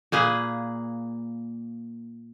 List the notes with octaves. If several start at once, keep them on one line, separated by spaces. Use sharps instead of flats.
A#2 A#3 G#4 B4